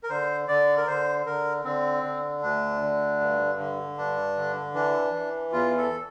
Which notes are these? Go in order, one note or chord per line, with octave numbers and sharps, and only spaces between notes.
A#4
D3 C5
D3 D5
A#4
D3 C5
D3 A#4
D3 C4
D3
D2 D4
D3
G2
D3
G2 D4
D3
E3 D4
E3
E2 F4
A4